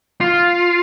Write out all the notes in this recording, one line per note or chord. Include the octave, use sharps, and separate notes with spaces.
F4